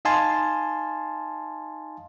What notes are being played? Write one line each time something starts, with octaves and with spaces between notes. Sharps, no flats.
D#4 D#5 F5 G#5 A5 C6